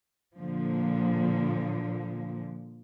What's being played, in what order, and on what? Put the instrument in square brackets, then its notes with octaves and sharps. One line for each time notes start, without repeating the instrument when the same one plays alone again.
[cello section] A#2 D3 F3